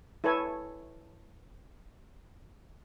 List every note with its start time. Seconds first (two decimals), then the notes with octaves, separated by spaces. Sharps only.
0.24 E4 A4 B4 C#5 G#5